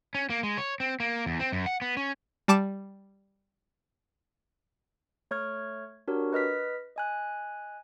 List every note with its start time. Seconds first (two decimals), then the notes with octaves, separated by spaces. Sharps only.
0.15 C#4
0.30 A#3
0.43 G#3
0.58 C#5
0.80 C4
1.00 A#3
1.26 E2
1.40 C4
1.52 F#2
1.66 F#5
1.81 B3
1.97 C#4
2.48 G3 A5 D6 E7
5.31 A3 C#5 C#6 F6 G#6
6.08 D4 F#4 G4 A#4 C#5
6.33 B4 D#5 F6 B6
6.96 D#5 G#5 F#6